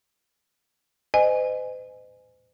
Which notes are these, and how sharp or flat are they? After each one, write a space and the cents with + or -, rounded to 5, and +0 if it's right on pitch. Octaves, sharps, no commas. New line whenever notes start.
C5 -40 D#5 -25 G#5 +0